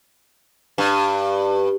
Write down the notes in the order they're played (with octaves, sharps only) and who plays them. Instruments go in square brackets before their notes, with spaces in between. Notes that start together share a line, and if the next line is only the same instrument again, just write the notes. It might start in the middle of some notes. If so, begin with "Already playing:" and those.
[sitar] G2